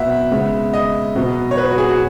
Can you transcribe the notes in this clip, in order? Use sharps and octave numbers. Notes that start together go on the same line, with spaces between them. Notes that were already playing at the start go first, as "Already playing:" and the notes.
Already playing: B2 F#3 B3 E5 F#5
C#3 G#3 B3
D#5
B2 F#3 B3
C#5
B4
F#4
G#4
F#4